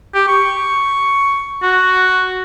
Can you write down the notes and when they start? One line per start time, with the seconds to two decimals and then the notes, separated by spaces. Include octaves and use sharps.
0.14 G4
0.28 C#6
1.63 F#4